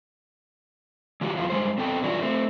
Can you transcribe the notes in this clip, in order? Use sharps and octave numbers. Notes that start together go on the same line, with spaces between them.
E3 F3 F#4 G4
E2 F4
G2 G#3 C5
B2 C4 A4 G5
G2 E3 F4 F#4 D5
A3 C4